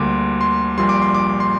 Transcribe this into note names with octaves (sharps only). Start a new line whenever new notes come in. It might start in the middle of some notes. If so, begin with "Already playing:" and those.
Already playing: D2 D3 G3 A#3 C6 D6
C6
A#1 A#2 G3 C6
D6
C6
D6
C6